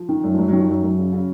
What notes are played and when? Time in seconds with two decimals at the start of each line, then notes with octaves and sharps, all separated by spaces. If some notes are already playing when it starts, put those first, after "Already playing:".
Already playing: F3
0.09 D#3
0.24 F#2
0.34 F3
0.38 F#2 F#3
0.48 D#3 F#3
0.58 F3
0.68 F#2 F#3
0.83 F#2
0.98 C#3
1.13 C#3